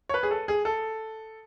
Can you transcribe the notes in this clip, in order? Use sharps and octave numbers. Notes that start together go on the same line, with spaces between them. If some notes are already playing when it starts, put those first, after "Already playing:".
C#5
B4
G#4
A4
G#4
A4